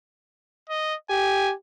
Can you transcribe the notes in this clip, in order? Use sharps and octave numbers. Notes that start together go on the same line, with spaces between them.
D#5
G4 G#5